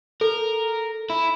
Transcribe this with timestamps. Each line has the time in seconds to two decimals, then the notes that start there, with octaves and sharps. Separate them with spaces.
0.21 A4 A#4
1.10 E4